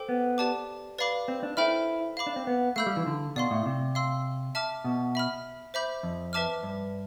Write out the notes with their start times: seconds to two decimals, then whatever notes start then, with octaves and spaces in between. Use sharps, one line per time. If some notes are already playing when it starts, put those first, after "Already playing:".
Already playing: A4 C5 G5 D6
0.09 B3
0.38 G4 D5 A5 D6
0.99 B4 D5 F5 B5 D6
1.28 C4
1.43 D4
1.57 E4 A4 C5 G5 B5 F6
2.17 F5 B5 D6
2.27 D4
2.36 C4
2.47 B3
2.76 A3 F5 B5 E6 G6
2.86 G3
2.97 E3
3.06 D3
3.36 B2 D5 F5 C6
3.51 A2
3.66 C3
3.95 F5 C6 E6
4.55 E5 A5 D6 F6
4.84 B2
5.15 E5 B5 F6
5.74 C5 E5 B5 D6 G6
6.03 F2
6.33 B4 E5 A5 D6 F6
6.63 G2